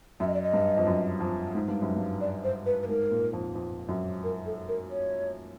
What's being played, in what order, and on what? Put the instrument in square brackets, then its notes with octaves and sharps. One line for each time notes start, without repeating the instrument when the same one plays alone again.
[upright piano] F#2 [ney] E5
[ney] D#5
D5
D#5
[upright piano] G2
F2
F#2
F2
G#2
G2
F#2
G2
[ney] D5
C5
B4
B4
[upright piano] G#2 [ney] A#4
[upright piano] A#2
F2
F2
F#2
[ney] A#4
A4
A#4
C#5